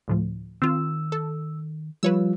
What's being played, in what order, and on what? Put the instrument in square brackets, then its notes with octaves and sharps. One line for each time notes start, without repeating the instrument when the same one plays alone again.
[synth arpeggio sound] D2 A2 F3
[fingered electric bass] D#3 [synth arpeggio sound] C4 F4 [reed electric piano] E6
[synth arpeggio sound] A4
[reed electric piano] F3 G3 F4 [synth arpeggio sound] B4 C#5 E6